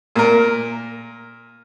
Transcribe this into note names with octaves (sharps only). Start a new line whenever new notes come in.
A#2 A#4